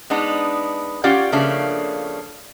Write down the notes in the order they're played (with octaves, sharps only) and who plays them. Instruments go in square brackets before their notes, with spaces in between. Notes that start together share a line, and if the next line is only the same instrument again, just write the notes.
[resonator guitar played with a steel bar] G#3 B3 D4 D#4
C#4 F4 G4 D5 F#5
C#3 F3 A3 A#3 D4